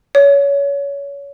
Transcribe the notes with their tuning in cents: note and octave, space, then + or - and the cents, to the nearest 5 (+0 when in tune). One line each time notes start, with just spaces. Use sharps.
C#5 +25